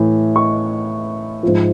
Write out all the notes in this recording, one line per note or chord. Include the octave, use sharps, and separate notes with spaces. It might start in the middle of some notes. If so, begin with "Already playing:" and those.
Already playing: A2 E3
C#6
G#2 F3